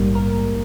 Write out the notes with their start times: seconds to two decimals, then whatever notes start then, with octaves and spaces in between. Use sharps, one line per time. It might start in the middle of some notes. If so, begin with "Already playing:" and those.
Already playing: A#1 G#2 G3 A#3
0.15 A#4